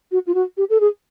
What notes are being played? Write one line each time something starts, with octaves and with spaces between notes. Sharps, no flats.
F#4
F4
F#4
G4
A4
G#4